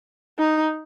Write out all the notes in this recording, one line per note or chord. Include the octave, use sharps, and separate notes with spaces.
D#4